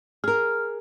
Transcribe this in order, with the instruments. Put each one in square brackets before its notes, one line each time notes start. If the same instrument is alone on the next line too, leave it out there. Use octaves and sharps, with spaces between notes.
[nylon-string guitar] G#4 A#4 [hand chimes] F6